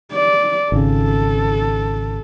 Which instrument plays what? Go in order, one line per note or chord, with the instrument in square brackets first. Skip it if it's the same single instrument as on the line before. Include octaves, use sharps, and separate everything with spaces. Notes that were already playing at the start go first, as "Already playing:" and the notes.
[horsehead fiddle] D5
[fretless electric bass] G#1 C#3 [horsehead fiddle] A4